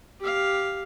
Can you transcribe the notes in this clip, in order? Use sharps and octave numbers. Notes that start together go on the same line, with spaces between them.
G4 F5